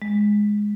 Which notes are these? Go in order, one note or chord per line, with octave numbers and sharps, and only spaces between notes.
G#3